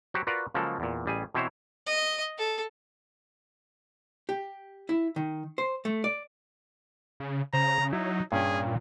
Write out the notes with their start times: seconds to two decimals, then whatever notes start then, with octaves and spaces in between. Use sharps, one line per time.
0.14 F#3 F#4 G4 C5
0.27 F4 F#4 A#4 B4 D5 F#5
0.54 C#3 F3 F#3 G#3 A#3 A4
0.80 E2 A#2
1.06 A1 G3 G#4 G#5
1.35 B2 E3 C4 E4 C5 C#5
1.86 D#5
2.38 A4
4.29 G4
4.89 E4
5.16 D#3
5.58 C5
5.85 A3
6.04 D5
7.20 C#3
7.53 C#3 C5 A#5
7.93 F#3 D#4 E4
8.32 G2 A#2 C#4 G#4 G5